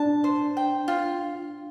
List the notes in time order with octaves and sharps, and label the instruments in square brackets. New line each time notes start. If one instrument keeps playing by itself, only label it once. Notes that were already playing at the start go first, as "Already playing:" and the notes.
Already playing: [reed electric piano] D4 [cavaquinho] A5
[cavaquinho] C5
G5
F4